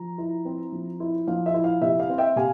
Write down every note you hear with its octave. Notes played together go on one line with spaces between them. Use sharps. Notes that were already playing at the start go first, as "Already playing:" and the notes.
Already playing: F3 A#5
E4
C4
F3
E4
F3 F5
E5
E4
F5
C3 E5
F5
C4
E5 G5
C3 F5 G#5